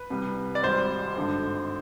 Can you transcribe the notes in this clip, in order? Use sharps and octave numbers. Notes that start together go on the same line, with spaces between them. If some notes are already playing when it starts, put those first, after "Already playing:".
Already playing: B4
C2 C3 G3
D5
G#1 G#2 G3 C5
G#1 G2 D3